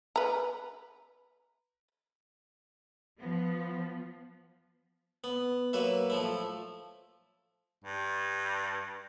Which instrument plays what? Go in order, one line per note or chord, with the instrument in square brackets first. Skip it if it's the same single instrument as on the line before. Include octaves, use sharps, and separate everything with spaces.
[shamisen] B4 A#5
[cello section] F3 B3
[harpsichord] B3
F#3 A#3 B4 E5
F3 A3 E4
[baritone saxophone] G2